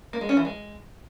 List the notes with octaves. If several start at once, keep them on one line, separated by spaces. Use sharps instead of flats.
A#3
G#3
C#4
E3
G#3